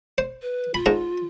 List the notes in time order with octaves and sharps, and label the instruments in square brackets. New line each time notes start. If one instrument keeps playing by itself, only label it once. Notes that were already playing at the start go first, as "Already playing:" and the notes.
[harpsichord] C5
[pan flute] B4
[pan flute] F4 [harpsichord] B5
[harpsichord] G#2 A#5